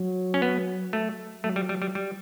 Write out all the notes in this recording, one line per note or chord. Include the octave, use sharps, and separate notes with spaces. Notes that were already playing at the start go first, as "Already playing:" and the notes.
Already playing: F#3
C#4
B3
A3
F#3 A3
G3
G3
G3
G3